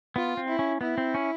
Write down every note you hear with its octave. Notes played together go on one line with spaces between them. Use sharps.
B3 F4
C4
E4
C#4
B3 E4
C4
C#4